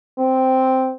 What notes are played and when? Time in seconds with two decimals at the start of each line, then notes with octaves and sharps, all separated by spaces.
0.18 C4